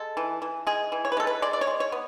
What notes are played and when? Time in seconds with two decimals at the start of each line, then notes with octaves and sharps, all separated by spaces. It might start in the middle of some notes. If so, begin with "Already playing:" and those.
Already playing: G#3 A4
0.17 E3
0.42 E3
0.67 G#3 G#4
0.92 E3
1.05 C#5
1.12 B4
1.17 G#3 A4
1.27 B4
1.42 G#3 D5
1.53 D5
1.61 C#5
1.67 G#3
1.80 C#5
1.92 B3